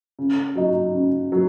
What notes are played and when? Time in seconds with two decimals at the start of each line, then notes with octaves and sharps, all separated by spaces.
0.19 C#3
0.55 F#3 D#4
0.94 C#3
1.32 F#3